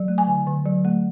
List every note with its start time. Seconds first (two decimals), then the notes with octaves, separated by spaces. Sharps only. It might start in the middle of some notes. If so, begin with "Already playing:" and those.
Already playing: F#3
0.08 A3
0.18 G#5
0.27 D3
0.47 D3
0.65 F#3
0.85 A3